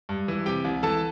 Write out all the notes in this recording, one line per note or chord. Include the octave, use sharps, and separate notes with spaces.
G2
E3
C3 G4 G5
C2
E3 A4 A5